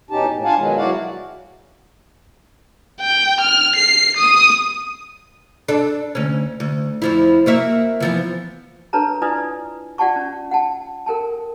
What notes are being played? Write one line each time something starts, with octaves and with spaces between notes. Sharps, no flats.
E2 B2 C#4 D#4 G4 A5
A2
D4 F4 F5 F#5 G#5 A5
B2 D#3 F#3 G#3 B3
F#3 E4 F#4 D5 F5 F#5
G5
F6
C7
D#6
D4 A4
D2 C#4
D2
F2 F3 E4
A#3 F#4 E5
E3 F3 B3
D4 A4 B4 C#5 A5 A#5
E4 F4 B4 D5 G#5 D#6
F4 D5 F#5 G5 A5 C#6
C#4
F#5 G5 A5
A4 A#4 G5 A5